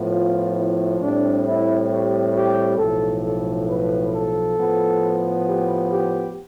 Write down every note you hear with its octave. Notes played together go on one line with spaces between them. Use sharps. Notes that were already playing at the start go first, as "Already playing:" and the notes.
Already playing: A2 F3 B3
F4
E4
A2 G3 C4 D4
E4
G4
G4
B1 A2 F3 A4
A4
B4
A4
A2 F3 B3
G4
G4